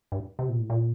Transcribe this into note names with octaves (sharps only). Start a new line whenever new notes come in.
G2
C3
A#2
A2
A#2